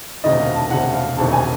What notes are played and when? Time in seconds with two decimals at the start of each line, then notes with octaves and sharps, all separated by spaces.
0.24 E1 D2 C3 D#3 D#5
0.40 F5
0.56 A5
0.70 E1 D2 C3 D#3 F#5
0.94 F5
1.17 E1 D2 C3 D#3 A5
1.33 G#5